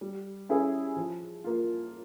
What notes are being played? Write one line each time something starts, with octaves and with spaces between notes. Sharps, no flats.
G3
C#4 E4 G#4
F3
A#3 F4